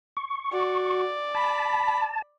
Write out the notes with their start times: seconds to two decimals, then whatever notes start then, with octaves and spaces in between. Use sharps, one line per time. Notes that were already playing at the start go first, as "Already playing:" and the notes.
0.17 C#6
0.52 F#4 D5
1.35 A5 B5